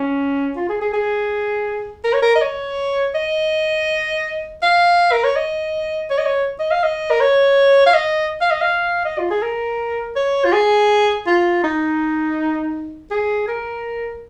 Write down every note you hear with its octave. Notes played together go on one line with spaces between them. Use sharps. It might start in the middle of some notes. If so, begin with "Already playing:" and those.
Already playing: C#4
F4
G#4
G#4
G#4
A#4
C#5
A#4
D#5
C#5
D#5
F5
A#4
C#5
D#5
C#5
D#5
C#5
D#5
F5
D#5
A#4
C#5
F5
D#5
F5
D#5
F5
D#5
F4
G#4
A#4
C#5
F4
G#4
F4
D#4
G#4
A#4